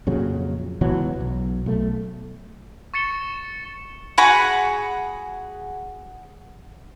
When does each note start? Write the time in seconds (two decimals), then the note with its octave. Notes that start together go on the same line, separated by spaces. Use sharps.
0.07 F2 A#2 C#3 F#3
0.81 C#2 B2 E3 F#3
1.20 B1
1.66 B1 A3
2.94 C#6 A6 C#7 E7 G7
4.18 F#4 G#4 F#5 B5